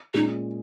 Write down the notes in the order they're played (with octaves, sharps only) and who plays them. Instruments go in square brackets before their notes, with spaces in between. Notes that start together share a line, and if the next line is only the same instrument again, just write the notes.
[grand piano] A#2 G#3 C#4 G#4 [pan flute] D#4